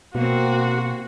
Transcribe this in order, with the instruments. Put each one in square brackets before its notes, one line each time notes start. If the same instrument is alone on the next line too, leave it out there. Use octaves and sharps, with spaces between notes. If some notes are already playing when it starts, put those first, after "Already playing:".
[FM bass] B2 [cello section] A#3 C4 [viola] F#4